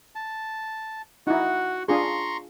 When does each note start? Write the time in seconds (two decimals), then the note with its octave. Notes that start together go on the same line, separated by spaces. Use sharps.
0.15 A5
1.27 D#4 E4 F#4 F#5
1.88 D4 F4 G#4 A#5 C6 C#6